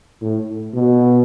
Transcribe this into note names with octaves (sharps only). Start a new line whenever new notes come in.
A2
B2